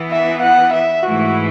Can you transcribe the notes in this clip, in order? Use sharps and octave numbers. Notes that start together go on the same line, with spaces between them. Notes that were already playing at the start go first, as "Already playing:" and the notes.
Already playing: E3 B3 E4
E5
F#5
E5
G#2 E3 A3 E4 F#4